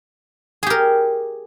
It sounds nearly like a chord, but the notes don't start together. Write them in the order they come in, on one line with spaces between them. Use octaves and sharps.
G#4 G4 A#4